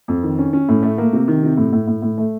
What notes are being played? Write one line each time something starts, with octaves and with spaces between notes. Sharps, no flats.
F2
D#3
C#4
C#4
A2
A3
A#3
C3
D#3
C3
A2
A2
A2
A2
A3